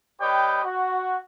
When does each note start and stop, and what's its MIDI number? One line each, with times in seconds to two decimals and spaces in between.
0.21 0.63 55
0.21 0.63 67
0.21 0.63 71
0.21 0.63 73
0.21 0.63 75
0.21 0.63 79
0.64 1.19 66